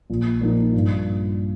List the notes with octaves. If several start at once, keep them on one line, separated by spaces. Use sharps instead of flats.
A#1
A#2 F3 A#3 D#4
G2